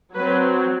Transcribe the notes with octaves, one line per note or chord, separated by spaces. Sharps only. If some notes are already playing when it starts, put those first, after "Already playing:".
F#3 C4 B4